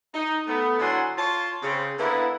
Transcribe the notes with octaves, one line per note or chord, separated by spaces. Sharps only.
D#4
A3 B3
D3 F#3 E4 F#5 G#5 C6
F4 C#5 A5 C6
C#3 C4
D3 A#3 B3 E4